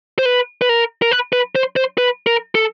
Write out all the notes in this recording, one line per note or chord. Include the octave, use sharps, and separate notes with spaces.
C5
B4
B4
A#4
A#4
B4
B4
C5
C5
B4
A#4
A4